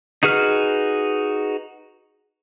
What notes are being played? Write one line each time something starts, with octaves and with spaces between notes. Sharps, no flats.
D#4 F#4 G#4 B4 F6